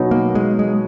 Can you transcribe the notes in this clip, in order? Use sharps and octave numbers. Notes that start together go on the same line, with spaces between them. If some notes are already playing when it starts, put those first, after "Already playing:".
Already playing: B2 F#3 B3 D#4
A#3
G#3
G#3